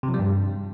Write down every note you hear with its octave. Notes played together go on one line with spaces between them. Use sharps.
C3
F3
G3
G2